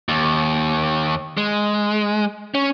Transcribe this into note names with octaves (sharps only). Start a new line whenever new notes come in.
D#2
G#3
C#4